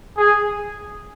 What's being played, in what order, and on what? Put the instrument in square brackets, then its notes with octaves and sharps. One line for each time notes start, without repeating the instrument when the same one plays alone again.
[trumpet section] G#4